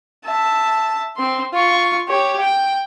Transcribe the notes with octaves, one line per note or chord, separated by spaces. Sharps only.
E5 A5
C4 C6
F4 C#6
G4 C#5
G5